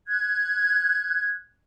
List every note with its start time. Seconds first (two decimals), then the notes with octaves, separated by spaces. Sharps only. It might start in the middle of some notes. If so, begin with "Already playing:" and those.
0.07 F#6 G#6